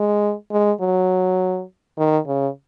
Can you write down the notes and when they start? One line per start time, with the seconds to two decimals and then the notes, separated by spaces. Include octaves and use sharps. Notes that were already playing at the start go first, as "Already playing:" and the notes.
Already playing: G#3
0.52 G#3
0.81 F#3
1.98 D#3
2.27 C#3